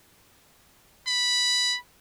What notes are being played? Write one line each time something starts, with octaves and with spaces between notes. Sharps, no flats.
B5